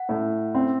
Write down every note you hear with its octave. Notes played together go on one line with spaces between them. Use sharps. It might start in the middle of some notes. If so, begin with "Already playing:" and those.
Already playing: F#5
A2
C4